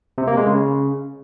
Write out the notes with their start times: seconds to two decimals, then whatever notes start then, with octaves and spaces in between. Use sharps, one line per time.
0.18 C3
0.27 A#3
0.37 G#3
0.47 C#3